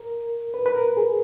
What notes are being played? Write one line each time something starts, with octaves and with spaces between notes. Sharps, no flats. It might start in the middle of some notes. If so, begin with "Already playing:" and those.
Already playing: A#4
B4
B4
A#4
G#4